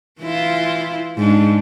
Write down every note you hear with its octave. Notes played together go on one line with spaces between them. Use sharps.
E3 E4 F4
G#2 D4